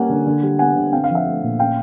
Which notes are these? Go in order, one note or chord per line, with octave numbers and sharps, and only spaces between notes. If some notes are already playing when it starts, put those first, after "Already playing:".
Already playing: G3 A#3 C#4 F#5 G#5
D3
D3
G3
B3 F#5 G#5
D3
C4 F5 G5
F5
F3
E5 F#5
A3
A#2
C#4 F5 G5